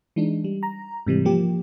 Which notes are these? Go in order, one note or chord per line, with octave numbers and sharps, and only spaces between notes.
E3 G#3 D4 D#4
G3
A#5
G#2 C3 E3 G3
F3 A#3 G4